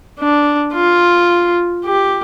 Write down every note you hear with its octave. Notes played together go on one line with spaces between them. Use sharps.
D4
F4
G4